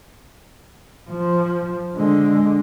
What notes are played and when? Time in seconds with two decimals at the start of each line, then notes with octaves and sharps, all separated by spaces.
1.10 F3
1.96 D3 G#3